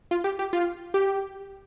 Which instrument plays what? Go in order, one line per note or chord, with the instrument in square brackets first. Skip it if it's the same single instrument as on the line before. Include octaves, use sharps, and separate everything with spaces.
[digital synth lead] F4
G4
G4
F4
G4